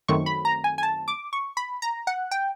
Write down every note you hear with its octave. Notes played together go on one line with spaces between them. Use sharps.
F#2 D#3 F#3 A3 C4 C#6
B5
A#5
G#5
G#5
A5
D6
C#6
B5
A#5
F#5
G5